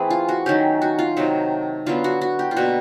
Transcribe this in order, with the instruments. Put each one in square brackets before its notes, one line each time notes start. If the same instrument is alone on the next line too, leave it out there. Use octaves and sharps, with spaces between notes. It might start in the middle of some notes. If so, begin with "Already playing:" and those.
Already playing: [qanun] E3 A3 C4 E4 G#4
F4
F#4
D#3 F#3 A3 C#4 G4
F#4
F4
C3 D#3 F#3 A3
D3 F#3 B3 F4
F#4
F#4
G4
F4
B2 G3 A#3 F#4